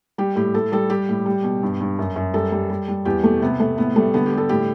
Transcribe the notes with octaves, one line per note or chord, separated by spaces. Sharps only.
G3 G4
A2 G4
A2 A4
G3 A4
G3 G4
A2
G3
B2
G2
G2
F#2
F#2
G3 A4
G3
G3
G3
E2 G4
B2 A3
C3 B3
C3 A3
A2 B3
G3 A3
D3 B3
G4
G3
A4
A2 G4